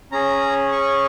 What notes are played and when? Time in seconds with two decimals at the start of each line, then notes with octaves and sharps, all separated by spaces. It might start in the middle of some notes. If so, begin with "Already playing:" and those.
0.12 C#4 G#4 A#5
0.72 C#6